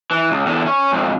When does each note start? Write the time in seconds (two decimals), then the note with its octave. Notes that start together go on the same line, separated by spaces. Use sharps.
0.11 E3
0.31 C#2
0.46 E2 D3
0.66 C#4
0.93 F2 G#2